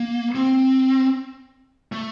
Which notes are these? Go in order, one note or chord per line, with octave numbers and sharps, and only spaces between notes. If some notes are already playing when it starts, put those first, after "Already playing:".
Already playing: A#3
C4
A3